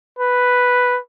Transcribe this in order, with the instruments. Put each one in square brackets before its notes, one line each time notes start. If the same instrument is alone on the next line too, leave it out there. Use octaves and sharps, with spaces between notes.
[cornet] B4